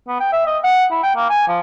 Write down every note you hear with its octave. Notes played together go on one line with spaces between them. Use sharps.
B3
G5
E5
D#5
F#5
E4
G5
A#3
G#5
F3